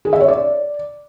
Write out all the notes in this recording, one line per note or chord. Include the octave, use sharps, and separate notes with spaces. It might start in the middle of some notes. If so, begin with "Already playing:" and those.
G#4
E5
C#5
D5